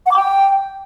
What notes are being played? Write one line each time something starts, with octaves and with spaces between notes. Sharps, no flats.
F#5
D6
G5